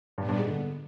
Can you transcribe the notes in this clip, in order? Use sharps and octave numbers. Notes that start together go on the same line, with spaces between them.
G2 A#2 G3 B3 D4
G2
G#2
D3